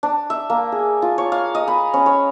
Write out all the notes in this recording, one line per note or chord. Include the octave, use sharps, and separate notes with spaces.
D4
E5
A#3
G#4
F4
C#5
F5
D#5
B5
C#4
C#5